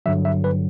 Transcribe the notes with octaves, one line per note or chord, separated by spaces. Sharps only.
G2 D3 F#3 E5
E5
B4